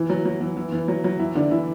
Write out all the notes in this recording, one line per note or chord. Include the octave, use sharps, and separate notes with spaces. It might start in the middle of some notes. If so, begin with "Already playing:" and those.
Already playing: E3
F#3
F#3
E3
E3
E3
F#3
F#3
E3 E4
D3 D4
E3 E4